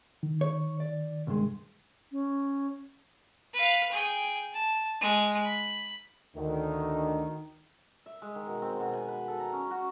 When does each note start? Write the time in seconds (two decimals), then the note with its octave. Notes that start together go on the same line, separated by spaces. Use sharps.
0.23 D#3
0.41 C#5
0.80 D5
1.27 C2 G2 G#3
2.12 C#4
3.53 B4 F5
3.91 G#4 G5
4.53 A5
5.01 G#3
5.44 B5
6.36 D2 D#3
8.06 E5
8.22 G#3
8.35 D#3
8.47 B2
8.62 C4
8.80 B2
8.93 G#5
9.08 B4
9.28 A4
9.40 A#5
9.53 C#4
9.71 F#4